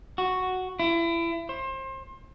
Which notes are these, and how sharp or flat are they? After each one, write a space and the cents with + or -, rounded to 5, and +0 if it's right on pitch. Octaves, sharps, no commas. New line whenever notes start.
F#4 +0
E4 +30
C5 +30